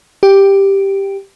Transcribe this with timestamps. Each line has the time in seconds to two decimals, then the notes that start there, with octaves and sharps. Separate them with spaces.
0.23 G4